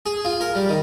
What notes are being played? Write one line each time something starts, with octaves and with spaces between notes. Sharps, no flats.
G#4
F4
A#4
G3
D#3